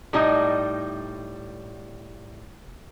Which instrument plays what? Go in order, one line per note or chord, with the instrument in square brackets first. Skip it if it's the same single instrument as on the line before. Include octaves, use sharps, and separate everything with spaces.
[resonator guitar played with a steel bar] A2 G3 D#4 D#5